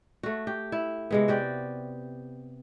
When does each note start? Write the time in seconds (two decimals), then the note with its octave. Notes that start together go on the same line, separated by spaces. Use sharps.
0.23 A3 F#4
0.47 G4
0.72 E4
1.11 C3 G#3 B3
1.28 F#4 G4 D5